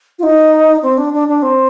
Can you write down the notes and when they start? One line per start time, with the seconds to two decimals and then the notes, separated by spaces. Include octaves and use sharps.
0.19 F4
0.23 D#4
0.83 C4
0.98 D4
1.13 D4
1.28 D4
1.42 C4